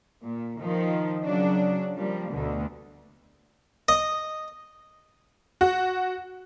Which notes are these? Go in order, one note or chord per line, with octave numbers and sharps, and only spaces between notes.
A#2
D#3 F3
C#3 F#3 D4
F3 G3 A#3
D2 B2 D3
D#5
F#4